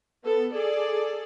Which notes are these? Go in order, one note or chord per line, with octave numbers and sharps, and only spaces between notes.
B3 A4
G#4 A4 D5